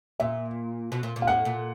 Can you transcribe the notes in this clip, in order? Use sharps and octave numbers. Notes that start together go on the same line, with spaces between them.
A#2 E5
B2
A#2
A#2
F5
A2 F#5
A#2